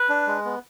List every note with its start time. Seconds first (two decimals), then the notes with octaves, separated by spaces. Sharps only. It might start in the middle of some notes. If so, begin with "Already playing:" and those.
Already playing: B4
0.09 D4
0.27 G#3
0.45 B3